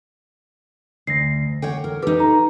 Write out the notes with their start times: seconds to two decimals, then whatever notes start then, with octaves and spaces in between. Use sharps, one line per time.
1.07 D2 A#6 C7
1.62 A4 C#5 F#5 G5
1.84 A#4
2.02 D#4 G4 A4 B4
2.20 A#5